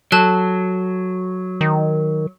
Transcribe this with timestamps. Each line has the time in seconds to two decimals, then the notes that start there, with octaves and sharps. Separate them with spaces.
0.12 F#3 A4 A5 F#6
1.61 D#3